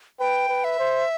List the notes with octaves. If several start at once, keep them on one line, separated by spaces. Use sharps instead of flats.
B4 G5
B4
E5
C5